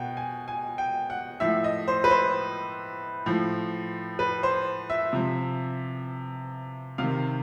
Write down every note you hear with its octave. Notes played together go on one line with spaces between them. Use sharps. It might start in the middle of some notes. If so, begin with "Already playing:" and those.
Already playing: B2 F#5 G5
G#5
G#5
G5
F#5
A2 F3 E5
D#5
C5
B4
C5
A2 F3
B4
C5
E5
C3 F3
C3 D#3 F5